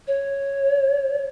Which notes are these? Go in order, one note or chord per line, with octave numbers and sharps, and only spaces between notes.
C#5